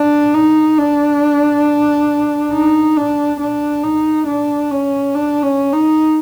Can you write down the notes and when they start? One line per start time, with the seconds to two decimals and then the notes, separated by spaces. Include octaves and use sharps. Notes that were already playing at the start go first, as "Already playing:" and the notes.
Already playing: D4
0.34 D#4
0.78 D4
2.53 D#4
2.97 D4
3.40 D4
3.83 D#4
4.27 D4
4.71 C#4
5.14 D4
5.43 C#4
5.72 D#4